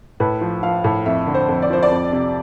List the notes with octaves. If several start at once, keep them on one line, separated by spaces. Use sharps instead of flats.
A2 B4
F3
F3 F5
A2
F2 E5
D3
C5
F2
D5
F3 C5
D5
F2
C3